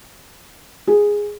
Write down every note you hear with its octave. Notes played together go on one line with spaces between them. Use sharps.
G#4